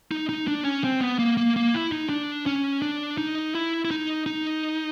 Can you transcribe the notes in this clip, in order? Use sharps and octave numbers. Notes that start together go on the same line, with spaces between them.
D#4
D#4
D4
C#4
C4
B3
A#3
A#3
A#3
E4
D#4
D4
C#4
D4
D#4
E4
E4
D#4
D#4